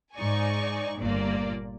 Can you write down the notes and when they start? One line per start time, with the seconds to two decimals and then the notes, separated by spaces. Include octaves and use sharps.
0.16 G#2 D#4 D5 G#5 C#6
0.98 G1 A#2 A#3 D5